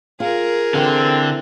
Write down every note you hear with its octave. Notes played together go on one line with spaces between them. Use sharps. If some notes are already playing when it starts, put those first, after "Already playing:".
F4 G#4 A#4
D3 E3 C4